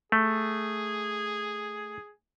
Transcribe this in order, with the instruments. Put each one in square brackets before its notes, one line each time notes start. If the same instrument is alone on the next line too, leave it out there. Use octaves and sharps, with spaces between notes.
[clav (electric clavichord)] A3 [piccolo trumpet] G#4